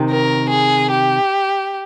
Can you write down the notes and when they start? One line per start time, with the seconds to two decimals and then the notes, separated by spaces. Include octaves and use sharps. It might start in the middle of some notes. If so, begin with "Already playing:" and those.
Already playing: C3 D#3
0.10 A#4
0.50 G#4
0.91 G4